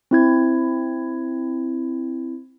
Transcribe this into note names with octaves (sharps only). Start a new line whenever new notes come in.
C4 E4 G#6